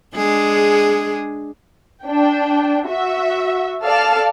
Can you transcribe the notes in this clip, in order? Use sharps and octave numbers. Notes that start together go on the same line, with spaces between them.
G#3 D4 G#4
D4 G5
F#4 E5
A4 D5 F5 A5 F6